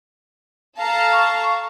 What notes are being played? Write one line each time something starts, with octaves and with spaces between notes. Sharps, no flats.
A4 F5 A5 A#5
C#6